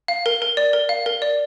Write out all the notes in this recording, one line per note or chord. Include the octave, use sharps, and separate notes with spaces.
F5
A#4
A#4
D5
A#4
F5
A#4
D5